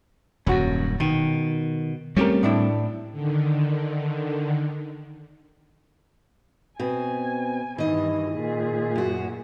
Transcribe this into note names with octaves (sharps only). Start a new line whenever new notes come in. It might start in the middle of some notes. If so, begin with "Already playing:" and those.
D#1 F#2 C#4 F#4
B2 D#3
G3 A3 C4 C#4 G4 A#4
A2 D4 E4
D3 D#3
B2 C4 G#5
G2 D#3 E3 D#5
A#2 G#4
F#2 F#4